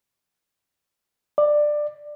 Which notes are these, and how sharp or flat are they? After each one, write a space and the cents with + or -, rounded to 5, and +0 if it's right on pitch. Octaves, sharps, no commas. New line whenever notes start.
D5 +15